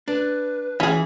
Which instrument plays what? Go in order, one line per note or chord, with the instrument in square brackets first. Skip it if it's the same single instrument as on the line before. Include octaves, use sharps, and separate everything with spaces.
[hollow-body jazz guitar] D4 [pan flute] B4
[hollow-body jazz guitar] E3 [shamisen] C#4 G#4